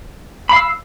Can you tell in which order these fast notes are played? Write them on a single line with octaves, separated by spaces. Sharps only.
B5 F5 E6